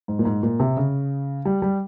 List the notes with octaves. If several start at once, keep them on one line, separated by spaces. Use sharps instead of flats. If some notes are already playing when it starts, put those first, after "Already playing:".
G#2
A#2
G#2
A#2
C3
C#3
G3
G3